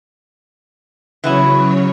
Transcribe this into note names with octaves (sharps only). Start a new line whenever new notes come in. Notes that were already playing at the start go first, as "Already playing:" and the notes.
C#3 E3 F#3 B3 E4 C#5